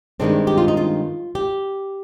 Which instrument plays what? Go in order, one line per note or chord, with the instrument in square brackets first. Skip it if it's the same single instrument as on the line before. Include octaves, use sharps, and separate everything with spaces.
[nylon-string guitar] G2 D#3 G#3 C4 D4
G4
F4
D#4
F4
G4